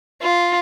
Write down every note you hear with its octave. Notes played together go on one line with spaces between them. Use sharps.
F4